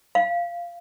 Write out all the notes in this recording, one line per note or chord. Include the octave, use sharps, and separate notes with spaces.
F5